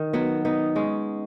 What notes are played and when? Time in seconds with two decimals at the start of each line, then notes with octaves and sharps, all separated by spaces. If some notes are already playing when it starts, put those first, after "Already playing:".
Already playing: D#3
0.13 F#3 B3
0.45 B3 D#4
0.75 G#3 C#4